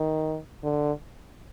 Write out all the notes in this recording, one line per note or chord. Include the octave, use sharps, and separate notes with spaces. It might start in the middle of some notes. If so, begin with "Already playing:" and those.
Already playing: D#3
D3